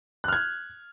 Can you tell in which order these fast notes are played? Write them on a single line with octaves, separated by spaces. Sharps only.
F#6 F6 G#6